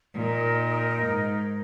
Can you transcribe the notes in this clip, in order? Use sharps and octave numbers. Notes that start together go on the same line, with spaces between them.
A#2 D#4 A#4 D#5
G#2